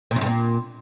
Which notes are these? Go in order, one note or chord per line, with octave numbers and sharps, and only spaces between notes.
A#2
F#2
G2
A#2